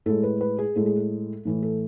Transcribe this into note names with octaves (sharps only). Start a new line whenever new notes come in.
A2 G#3 A4
B4
B4
G#4
A2 G#3 A4
G#4
A4
A2 E3 A3
A4